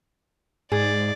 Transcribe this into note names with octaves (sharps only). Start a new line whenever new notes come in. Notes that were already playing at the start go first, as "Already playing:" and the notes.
G#2 G#4 D5